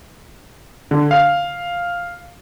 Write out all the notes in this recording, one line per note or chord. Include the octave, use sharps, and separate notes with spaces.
D3
F5